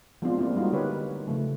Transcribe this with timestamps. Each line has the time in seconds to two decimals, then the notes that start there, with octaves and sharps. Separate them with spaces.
0.22 F3 G#3 B3 C4 D4 F4
0.37 A#3 C4 D4 E4 G4
0.55 G3 G#3 D#4 F4 F#4
0.73 D3 C4 G4 A#4 B4 C#5
1.11 D#4
1.28 C#3 F3 A3